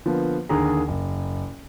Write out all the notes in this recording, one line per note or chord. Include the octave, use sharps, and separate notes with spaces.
D3 F3 A#3 B3
D#2 D3 A#3 G#4 A#5
F#1